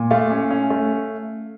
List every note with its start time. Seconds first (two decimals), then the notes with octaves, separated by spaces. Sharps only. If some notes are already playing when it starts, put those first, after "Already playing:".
Already playing: A#2
0.11 A3 F5
0.30 C#4
0.50 C#4
0.70 A3